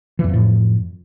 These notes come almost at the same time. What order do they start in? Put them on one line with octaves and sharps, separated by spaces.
E3 F2 F3 A2